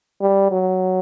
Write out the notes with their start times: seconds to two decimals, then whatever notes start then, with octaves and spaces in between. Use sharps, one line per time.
0.21 G3
0.51 F#3